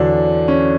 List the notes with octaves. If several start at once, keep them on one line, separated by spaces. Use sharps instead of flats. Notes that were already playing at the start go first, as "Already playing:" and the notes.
Already playing: E2 D3 F#3 D4
C#4